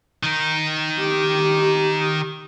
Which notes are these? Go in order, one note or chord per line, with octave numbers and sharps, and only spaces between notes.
D#3 D#4
G4